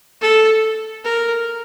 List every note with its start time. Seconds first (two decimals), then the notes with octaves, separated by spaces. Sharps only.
0.22 A4
1.05 A#4